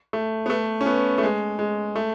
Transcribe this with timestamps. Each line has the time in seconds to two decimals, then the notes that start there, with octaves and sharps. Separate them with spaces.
0.13 A3
0.46 B3
0.50 A3
0.81 C#4
0.86 B3
1.18 A3
1.23 G#3
1.59 G#3
1.96 A3